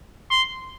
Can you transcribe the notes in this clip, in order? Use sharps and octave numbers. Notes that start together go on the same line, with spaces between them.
C6